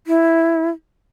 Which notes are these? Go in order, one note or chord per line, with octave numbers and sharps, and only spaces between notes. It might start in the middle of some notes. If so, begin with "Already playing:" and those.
E4